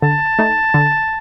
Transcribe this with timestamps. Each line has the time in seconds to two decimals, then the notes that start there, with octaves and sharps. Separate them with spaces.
0.02 D3 A5
0.39 A3 D#4
0.74 D3